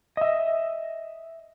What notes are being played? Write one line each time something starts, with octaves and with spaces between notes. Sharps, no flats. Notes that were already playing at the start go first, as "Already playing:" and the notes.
D#5 E5